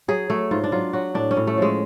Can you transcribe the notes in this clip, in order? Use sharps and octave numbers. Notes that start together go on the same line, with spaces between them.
F#3 G#4
F#3 A3
G#2 F4
D4
F#3 F4
F#3 F#4
A2 D4
C#4
A2
A3
F3 G#3